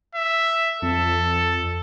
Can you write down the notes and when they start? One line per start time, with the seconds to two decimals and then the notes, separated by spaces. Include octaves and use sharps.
0.15 E5
0.82 F2 A4